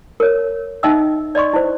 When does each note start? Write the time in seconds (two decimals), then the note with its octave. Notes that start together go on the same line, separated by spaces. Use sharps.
0.20 A#4 C#5
0.83 D#4 D#5 E5 G5 E6
1.35 D5 D#5 C6 C#6
1.53 E4 C5